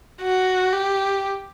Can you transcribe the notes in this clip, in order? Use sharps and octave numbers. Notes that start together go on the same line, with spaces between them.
F#4
G4